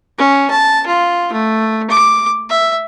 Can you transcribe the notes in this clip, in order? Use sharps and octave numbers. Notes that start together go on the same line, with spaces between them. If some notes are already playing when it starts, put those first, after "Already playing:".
C#4
A5
F4
A3
D6
E5